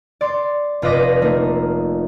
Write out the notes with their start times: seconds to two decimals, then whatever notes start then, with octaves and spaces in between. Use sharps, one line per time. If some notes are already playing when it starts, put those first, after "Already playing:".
0.21 D5 C6
0.82 F1 F4 B4 D#5 D6 A#6
1.21 A3 A#3 D#4